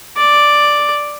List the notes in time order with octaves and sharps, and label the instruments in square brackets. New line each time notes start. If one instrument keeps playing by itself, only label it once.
[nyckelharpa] D5